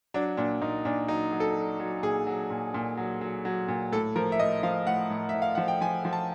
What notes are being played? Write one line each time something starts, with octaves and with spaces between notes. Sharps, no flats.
F#3 D4
A#2 D4
A#2 D#4
A#2 D4
F#3 D#4
F#3
A4
F#3
F#3
A#2 G#4
F#3
A#2
A#2
F#3
F#3
F#3
A#2
A2 A4
F3 A#4
E5
A2 D#5
F3 F5
A2 F#5
A2
A2 E5
F5
F3 F#5
G5
F3 G#5
F3
A5